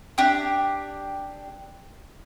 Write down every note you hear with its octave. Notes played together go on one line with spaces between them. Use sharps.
D4 G4